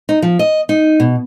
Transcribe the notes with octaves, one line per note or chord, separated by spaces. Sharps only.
D#4
F3
D#5
D#4
B2